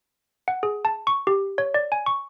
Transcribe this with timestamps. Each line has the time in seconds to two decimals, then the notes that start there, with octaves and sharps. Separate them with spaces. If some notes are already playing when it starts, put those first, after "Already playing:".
0.48 F#5
0.63 G#4
0.85 A5
1.07 C#6
1.27 G4
1.58 C#5
1.74 D5
1.92 G#5
2.06 C#6